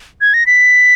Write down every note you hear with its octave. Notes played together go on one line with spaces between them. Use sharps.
G#6
A#6
B6